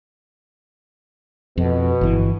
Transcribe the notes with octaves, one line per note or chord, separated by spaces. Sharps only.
F2 B2
G1 E3